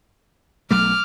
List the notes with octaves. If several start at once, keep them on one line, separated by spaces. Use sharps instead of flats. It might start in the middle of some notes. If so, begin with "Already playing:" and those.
B1 F#3 A3 D6 F6